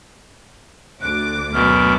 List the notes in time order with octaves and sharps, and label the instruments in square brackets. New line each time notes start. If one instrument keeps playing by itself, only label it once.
[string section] D2 D6 [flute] F#6
[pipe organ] F#2 B2 [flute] F6